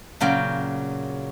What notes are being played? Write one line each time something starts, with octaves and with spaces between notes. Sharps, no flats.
A#2 C#3 F#3 G5